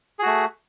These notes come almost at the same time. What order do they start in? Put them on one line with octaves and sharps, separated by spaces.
G#4 F#4 A3